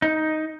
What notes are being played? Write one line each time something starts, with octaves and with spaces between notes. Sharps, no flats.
D#4